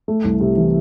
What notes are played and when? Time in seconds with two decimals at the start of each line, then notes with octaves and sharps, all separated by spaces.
0.08 A3
0.24 C2
0.40 C3
0.57 E3